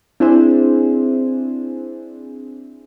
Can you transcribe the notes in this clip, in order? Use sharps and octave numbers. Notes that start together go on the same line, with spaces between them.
C4 D4 E4 G#4 C5